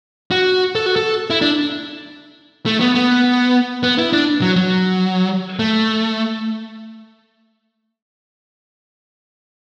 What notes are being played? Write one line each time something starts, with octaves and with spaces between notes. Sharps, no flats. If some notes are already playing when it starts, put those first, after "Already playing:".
F#4
A4
F#4
A4
E4
D4
A3
B3
B3
B3
E4
D4
F#3
F#3
A3